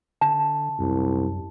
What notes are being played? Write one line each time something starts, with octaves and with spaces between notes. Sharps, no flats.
D3 A5
C2 F#2